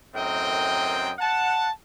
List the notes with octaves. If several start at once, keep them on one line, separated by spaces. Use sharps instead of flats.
F#2 A2 C4 A#4 D#5 G5
F#5 A5